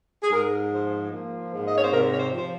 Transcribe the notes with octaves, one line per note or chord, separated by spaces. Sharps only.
G#4
G#2 A#4
F3 C5
A#3
G#2
D#5
C#5
C5
C3 A#4
C#5
C5
F3 C5